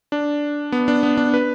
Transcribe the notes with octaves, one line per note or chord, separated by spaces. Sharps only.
D4
B3
D4
B3
D4
B4